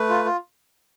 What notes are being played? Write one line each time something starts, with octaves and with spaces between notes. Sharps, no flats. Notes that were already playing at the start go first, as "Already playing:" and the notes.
Already playing: A3 B4
F4
F4